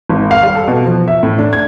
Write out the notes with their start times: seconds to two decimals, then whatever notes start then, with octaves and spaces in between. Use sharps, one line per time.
0.09 G#1
0.31 F5
0.43 G3
0.55 A4
0.68 B2
0.86 F3
1.08 E5
1.23 A2
1.38 D4
1.53 G#6